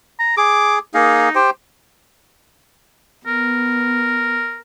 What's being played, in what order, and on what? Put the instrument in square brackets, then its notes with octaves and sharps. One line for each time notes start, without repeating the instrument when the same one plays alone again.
[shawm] A#5
[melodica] G#4 [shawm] D6
[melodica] A#3 G#4 F5 [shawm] D#4
[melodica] G4 C5 G5
[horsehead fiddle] B3 [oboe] A#4